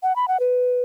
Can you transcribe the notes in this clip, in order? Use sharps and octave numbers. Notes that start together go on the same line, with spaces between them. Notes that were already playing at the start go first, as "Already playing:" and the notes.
F#5
B5
F#5
B4